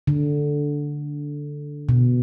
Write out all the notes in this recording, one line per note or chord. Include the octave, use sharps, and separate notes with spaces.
D3
B2